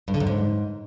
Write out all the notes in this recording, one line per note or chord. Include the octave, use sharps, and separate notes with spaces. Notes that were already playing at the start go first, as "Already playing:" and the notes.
G2
D3
F#2
G#2